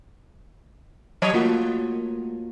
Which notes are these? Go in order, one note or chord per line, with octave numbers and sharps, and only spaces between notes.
F#3 C#5 D#5
A3 A#3 F4 F#4